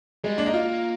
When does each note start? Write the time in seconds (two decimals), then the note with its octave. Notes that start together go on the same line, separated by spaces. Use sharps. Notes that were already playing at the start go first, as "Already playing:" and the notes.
0.24 G3 G#3
0.38 A#3 D4
0.46 D#4
0.54 F4